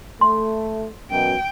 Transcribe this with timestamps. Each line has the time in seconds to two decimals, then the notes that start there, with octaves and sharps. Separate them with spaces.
0.21 A3 C6
1.11 F#2 B2 G5